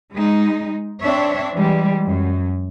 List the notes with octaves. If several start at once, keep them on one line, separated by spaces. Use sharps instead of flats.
G#3 D#4
C4 D4 C#5 E5
E3 G3 G#3
F#2